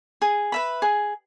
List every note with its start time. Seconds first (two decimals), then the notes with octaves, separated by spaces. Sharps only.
0.22 G#4
0.52 B4 E5 B5
0.82 G#4